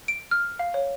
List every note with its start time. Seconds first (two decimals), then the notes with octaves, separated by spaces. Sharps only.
0.08 D7
0.31 F6
0.59 F5
0.74 C#5